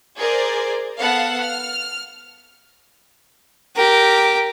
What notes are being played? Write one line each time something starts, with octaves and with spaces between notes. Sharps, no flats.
G#4 A#4 C5 D5
B3 A4 F5 F#5 A5
F6
G4 A#4